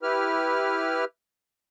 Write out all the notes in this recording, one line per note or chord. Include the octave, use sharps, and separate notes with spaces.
E4 G4 B4 F6